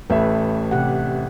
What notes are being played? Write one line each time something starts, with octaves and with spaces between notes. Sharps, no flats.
A1 A3 B4 E5
C3 G4 F#5